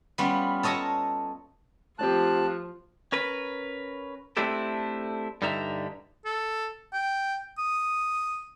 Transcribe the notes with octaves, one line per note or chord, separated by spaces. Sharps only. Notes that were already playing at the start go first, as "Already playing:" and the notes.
G3 B3 C#4 F4
A4 C#5 D#5 A5 A#5
F3 A3 C4 F4 G4 A5 F#6
C#4 A#4 B4
A3 C4 D4 E4 G4 A4
G2 D3 G3 D#4 E5 A#5
A4
G5
D#6